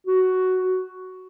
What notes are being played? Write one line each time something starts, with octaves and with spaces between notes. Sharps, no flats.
F#4